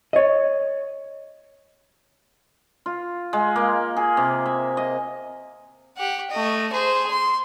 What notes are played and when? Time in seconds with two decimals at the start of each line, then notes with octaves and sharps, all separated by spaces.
0.13 C#5 D#5
2.86 F4
3.33 G#3
3.56 A#3
3.97 G#4
4.17 C3
4.46 E5
4.77 D#5
5.97 G4 F#5
6.31 A3 D#5
6.73 G#4 C5
7.11 C6